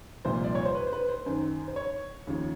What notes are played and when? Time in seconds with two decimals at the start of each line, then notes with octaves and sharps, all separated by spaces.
0.25 C2 A#2 F3 C5
0.44 D5
0.55 C#5
0.65 C5
0.75 B4
0.87 C5
0.93 B4
1.09 C5
1.26 F#2 D#3 C5
1.68 C5
1.76 C#5
2.27 D#2 C#3 F3